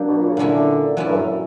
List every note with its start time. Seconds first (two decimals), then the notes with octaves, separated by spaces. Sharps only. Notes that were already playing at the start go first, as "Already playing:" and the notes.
Already playing: F#3 A#3 D4 G4
0.08 B2
0.18 A#2
0.28 C#3
0.37 A#2 D3 A#3 C#4 E4
0.97 D3 F#3 C#4 E4
1.06 G2
1.16 F#2